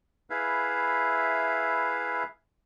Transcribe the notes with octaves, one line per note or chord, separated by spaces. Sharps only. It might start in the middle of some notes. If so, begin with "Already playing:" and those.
E4 G#4 B4 E5 F5